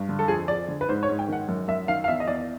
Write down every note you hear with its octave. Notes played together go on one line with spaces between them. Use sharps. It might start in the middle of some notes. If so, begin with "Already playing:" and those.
Already playing: G2
D3
A4
F2 G#4
F2 D5
D3
B4
G#2 C5
C#5
G#2
G5
D#3 F#5
F#2
F#2 E5
D#3 F5
F5
E2 E5
D#5
E2 D5